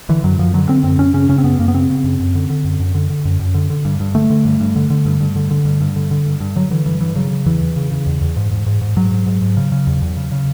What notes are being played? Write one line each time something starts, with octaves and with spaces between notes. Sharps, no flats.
D3 E3
F#2 F#3
F#2 F3
D3 F#3
D3 C4
F#2 C4
F#2 C#4
C#3 C#4
C#3 C#4
C4
F#2 B3
F#2 A#3
B3
C#3 C4
C#3
F#2
F#2
D3
D3
F#2
F#2
D3
D3
F#2
F#2
D3
D3
G2
G2
D3 A3
D3
G2
G2
D3
D3
G2
G2
D3
D3
G2
G2
D3
D3
G2
G2
D3 F#3
D3 E3
G2 E3
G2 E3
C#3 F#3
C#3
E2 E3
E2
C#3
C#3
E2
E2
G#2
G#2
G#2
G#2
G#2 F#3
G#2
G#2
G#2
C#3
C#3
E2
E2
C#3
C#3